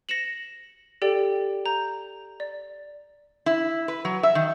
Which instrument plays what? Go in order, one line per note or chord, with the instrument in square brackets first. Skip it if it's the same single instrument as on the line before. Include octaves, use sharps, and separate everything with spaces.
[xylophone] A#6 C#7 E7 F#7
G4 A4 D5 G5
A#5 G6
D5
[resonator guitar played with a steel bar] E4
B4
F#3
E5
D#3